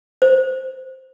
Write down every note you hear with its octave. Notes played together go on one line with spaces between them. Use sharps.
C5